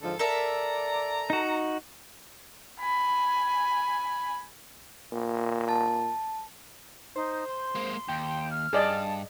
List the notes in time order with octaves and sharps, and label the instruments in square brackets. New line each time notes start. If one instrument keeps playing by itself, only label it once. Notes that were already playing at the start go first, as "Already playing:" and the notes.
[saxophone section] G#2 D3 F3 [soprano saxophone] A4
[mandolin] A4 A#4 E5 [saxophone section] D5 [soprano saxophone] A#5
[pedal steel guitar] D#4 F#4
[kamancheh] G#5 B5
[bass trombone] A#2
[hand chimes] A5
[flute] D#4 [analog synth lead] C5
[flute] C6
[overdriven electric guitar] G#3 A#3
[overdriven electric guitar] D#2 [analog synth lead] G5
[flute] F6
[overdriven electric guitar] G2 [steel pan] G#4 D5 D#5 [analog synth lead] A5